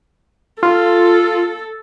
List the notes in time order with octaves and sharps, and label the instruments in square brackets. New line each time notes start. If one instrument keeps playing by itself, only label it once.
[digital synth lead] F4 [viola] A4